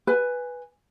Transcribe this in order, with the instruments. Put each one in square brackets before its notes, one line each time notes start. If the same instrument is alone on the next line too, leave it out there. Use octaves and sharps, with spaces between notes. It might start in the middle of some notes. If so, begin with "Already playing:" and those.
[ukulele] B4 G#5